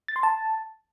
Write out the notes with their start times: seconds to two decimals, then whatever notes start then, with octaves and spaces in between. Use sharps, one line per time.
0.08 A6
0.16 C6
0.23 A5